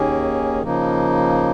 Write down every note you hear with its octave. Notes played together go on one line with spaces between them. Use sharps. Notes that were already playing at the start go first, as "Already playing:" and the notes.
Already playing: D#2 D#3 A#3 C#4 G#4
C#3 F3 A#3 D#4